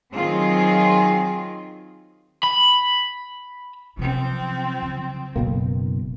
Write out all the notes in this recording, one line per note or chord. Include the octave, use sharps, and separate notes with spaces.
D#3 F#3 C4 F4 G#4
B5
C3 F3 F#3 C4
C#3 F#3
F#1 B2 E3 A#3